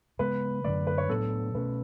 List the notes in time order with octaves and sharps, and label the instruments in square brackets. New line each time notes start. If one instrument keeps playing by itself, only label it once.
[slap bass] C#3 G#3 B3 [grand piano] B4
[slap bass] F#2 D3 F#3 A3 [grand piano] D5
[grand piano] B4
C#5
[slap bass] A2 F#3 B3 D4 [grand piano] A4
[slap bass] B2 A3 C#4 [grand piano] B4